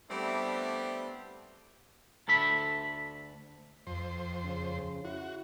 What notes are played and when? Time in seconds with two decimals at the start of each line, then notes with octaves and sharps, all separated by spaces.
0.10 G3 A3 B3 C4 D4 E4
2.28 D2 A4 E5 B5
3.87 F2 C5
4.44 C#3
5.05 E4 F#4